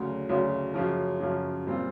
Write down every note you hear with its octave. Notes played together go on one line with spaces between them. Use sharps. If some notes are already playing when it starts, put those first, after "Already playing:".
Already playing: D2 C#3 F#3
D2 C#3 F#3
F#2 C#3 F3
F#2 C#3 F3
A#2 G3 C4 F4